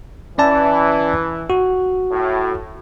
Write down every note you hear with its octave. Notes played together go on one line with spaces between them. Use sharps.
E3 C#4 D5 A5
F#4
A2